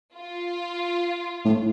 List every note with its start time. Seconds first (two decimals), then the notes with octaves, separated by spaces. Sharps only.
0.16 F4
1.45 A2